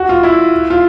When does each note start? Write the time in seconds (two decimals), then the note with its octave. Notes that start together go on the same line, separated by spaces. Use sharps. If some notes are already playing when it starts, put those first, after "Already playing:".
Already playing: F#4
0.09 F4
0.23 E4
0.70 F4